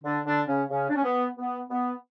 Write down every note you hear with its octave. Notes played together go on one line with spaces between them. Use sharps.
D3 D4
D3 D4
C#3 C#4
C#3 C#4
D4
C#4
B3
B3
B3